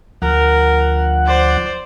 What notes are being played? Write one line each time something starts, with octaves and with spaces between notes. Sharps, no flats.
D2 F3 A#4 F#5
C5 D5